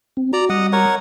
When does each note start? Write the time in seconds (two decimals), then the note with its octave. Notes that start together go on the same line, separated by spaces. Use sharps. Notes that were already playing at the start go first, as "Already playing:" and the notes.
0.17 C4
0.33 F#4 D5 A#5
0.49 G3 D#5 F#5
0.73 A#4 C#5 F#5